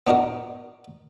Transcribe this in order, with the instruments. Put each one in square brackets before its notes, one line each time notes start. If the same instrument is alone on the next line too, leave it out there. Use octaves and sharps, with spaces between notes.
[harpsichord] B3 D4 D#4 F#4 A#4